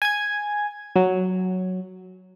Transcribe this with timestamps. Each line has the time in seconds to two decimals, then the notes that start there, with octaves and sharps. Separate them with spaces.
0.02 G#5 G#6
0.96 F#3